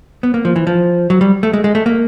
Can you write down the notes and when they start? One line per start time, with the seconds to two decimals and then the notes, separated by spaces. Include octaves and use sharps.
0.23 B3
0.34 A#3
0.45 F3
0.56 E3
0.67 F3
1.10 F#3
1.21 G3
1.43 A3
1.53 G#3
1.64 G#3
1.75 A3
1.86 A#3